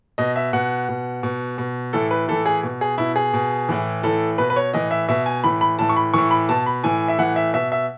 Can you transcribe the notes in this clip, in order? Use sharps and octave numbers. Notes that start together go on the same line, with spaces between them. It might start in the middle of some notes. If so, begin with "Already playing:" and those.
B2 D#5
E5
B2 F#5
B2
B2
B2
A2 E3 A4
B4
A2 E3 A4
G#4
B2
G#4
B2 E4
G#4
B2
A2 E3
A2 E3 A4
B2 B4
B4
C#5
A2 E3 D#5
E5
B2 E5
G#5
A2 E3 B5
B5
A2 E3 A5
C#6
B5
A2 E3 C#6
B5
B2 A5
B5
A2 E3 G#5
E5
A2 E3 F#5
E5
B2 E5
E5